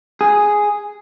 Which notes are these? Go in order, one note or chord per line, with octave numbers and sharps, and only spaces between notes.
G#4